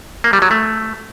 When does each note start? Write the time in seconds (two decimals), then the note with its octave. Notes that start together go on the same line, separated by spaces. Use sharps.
0.24 A#3
0.33 G3
0.42 F#3
0.51 A3